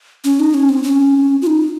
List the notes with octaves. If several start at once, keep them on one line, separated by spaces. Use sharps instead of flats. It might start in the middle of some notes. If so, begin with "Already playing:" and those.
C#4
D#4
C#4
C4
C#4
F4
D#4